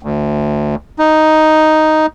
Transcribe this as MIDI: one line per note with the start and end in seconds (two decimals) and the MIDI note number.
0.03 0.75 38
0.99 2.06 63